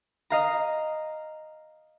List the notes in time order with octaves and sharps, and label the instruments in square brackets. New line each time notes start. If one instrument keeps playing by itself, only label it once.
[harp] D#5 F5 A#5